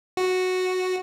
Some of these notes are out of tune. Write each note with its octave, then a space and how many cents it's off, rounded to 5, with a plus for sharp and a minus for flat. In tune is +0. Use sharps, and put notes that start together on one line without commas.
F#4 -5